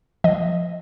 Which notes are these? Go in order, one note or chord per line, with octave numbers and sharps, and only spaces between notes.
F3 D#5